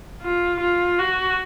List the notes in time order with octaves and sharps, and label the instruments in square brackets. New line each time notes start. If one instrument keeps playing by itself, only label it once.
[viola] F4
F4
F#4